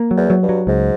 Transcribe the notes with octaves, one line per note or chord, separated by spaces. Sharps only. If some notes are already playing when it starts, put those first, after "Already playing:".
Already playing: A#3
F#3
E2
F#3
G2
F#3
C#2 G#2